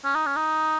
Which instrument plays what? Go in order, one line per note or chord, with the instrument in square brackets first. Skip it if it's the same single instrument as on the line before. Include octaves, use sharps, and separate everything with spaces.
[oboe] C#4
D#4
C#4
D#4